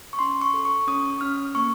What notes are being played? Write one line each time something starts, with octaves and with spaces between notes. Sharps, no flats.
C#6
C#4 C6
C#6
A4
C#6
C#4 D#6
C#4 F6
A#3 C#6